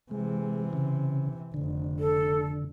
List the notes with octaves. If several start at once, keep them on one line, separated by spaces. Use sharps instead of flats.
C3 E3 G#3
C#3
F1 D3
A4